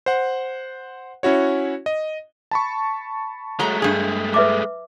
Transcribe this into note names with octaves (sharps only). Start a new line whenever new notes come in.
C5 F#5
C#4 E4 F#4 C#5
D#5
A5 B5 C#6
F#3 G#3 A3 A#5
G2 G#4
B4 E5 D6